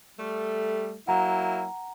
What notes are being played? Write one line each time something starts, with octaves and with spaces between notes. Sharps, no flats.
G3 A3
F#3 A#3 E4 F#5 A#5